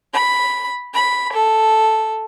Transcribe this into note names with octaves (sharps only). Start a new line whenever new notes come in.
B5
B5
A4